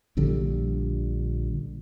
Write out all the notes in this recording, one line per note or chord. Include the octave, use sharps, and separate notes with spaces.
A#1 A#2 D3 G3